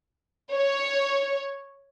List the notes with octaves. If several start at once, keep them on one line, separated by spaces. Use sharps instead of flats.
C#5